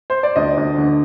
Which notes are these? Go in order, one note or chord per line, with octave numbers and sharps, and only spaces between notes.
C5
D5
D2 D#5
D2
D3